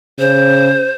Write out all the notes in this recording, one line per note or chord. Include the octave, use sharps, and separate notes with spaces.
C#3 C5